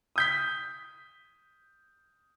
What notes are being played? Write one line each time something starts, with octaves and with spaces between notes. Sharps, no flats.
D#6 G6 B6